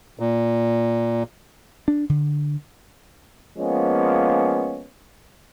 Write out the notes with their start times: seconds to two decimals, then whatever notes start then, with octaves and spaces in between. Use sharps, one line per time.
0.19 A#2
1.88 D4
2.09 D3
3.57 F3 G#3 A#3 B3 C#4